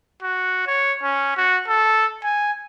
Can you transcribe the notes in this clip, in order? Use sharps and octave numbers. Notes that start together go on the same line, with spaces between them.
F#4
C#5
C#4
F#4
A4
G#5